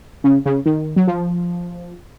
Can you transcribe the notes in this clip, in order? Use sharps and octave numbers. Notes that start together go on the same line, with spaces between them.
C#3
C#3
D#3
F#3
F3